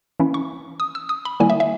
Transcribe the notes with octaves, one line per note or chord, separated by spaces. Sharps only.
E3 A#3 C#4 E4
C#6
D#6
E6
D#6
B5
D#3 G3 A#3 E4 G#5
E5
E5